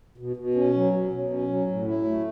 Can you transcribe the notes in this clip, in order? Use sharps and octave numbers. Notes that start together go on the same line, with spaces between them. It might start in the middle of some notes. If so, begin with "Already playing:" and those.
B2
B2
C#4
F#3
B2
B2
C#4
F#3
A2
E4
A3